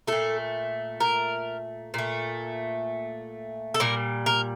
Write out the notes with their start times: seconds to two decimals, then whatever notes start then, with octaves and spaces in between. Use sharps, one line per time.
0.07 A#2 A3 A4
1.00 A#4
1.94 A#2 A3
3.74 A4
3.80 A#2 G3 A#4
4.26 A#4